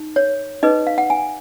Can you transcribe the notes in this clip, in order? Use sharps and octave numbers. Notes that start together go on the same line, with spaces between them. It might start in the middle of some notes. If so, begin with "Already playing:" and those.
Already playing: D#4
C#5
D#4 G#4 B4 D#5
F5
F#5
G#5